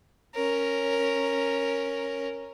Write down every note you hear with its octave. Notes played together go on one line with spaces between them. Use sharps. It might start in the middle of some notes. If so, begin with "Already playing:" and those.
C#4 A#4